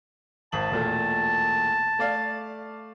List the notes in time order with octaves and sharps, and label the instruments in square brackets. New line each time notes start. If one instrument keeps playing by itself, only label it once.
[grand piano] G#1 F#7 [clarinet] A5
[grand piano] E1 A#2 A3
A3 D5 F5